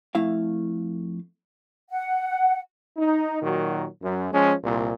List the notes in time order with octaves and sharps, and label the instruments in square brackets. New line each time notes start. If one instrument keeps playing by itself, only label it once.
[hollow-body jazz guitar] F2 A3 E4 F5
[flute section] F#5
[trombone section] D#4
A#2 D#3 F#3 F#4
F#2
F3 G#3 C#4
C2 A#2